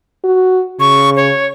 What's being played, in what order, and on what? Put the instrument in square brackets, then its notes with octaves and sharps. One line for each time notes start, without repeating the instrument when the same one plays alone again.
[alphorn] F#4
[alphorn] C#3 [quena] C#6
[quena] C#5